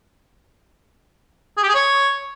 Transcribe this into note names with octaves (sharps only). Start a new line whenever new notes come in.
G#4
G4
G#4
C#5